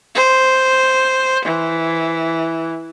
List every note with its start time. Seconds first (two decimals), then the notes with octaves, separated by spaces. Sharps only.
0.16 C5
1.45 E3